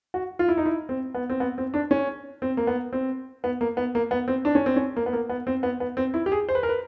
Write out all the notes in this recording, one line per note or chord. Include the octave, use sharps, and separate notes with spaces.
F#4
F4
E4
D#4
E4
C4
B3
C4
B3
C4
D4
C#4
C4
A#3
B3
C4
B3
A#3
B3
A#3
B3
C4
D4
C#4
C4
C#4
A#3
B3
A#3
B3
C4
B3
B3
C4
E4
G4
G#4
C5
B4
A#4
B4